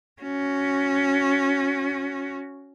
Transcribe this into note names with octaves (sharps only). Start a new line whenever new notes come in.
C#4 F#4